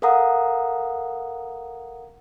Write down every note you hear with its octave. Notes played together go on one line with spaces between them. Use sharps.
A4 A#4 F5 F#5 A#5 D#6